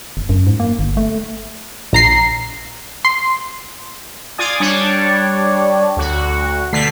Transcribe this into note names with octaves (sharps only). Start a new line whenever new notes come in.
F#1
F#2
G#2
A#3
G1
A3
A#1 A#5 C7
C6
F4 D5 G#5 D#6
G3 D4 C#5 D5
D2 F#4
B2 D3 A3 B6 C7